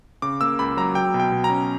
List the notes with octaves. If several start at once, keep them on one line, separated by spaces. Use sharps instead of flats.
C#3 D6
A#3 E6
C#2 B5
F#3 A#5
F#3 G5
B2
G5
B2
A#5
C#4